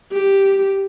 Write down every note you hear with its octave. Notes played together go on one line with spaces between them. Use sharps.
G4